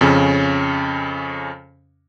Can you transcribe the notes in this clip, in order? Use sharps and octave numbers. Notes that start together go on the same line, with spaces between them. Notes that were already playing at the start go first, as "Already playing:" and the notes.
F2 C#3 C#4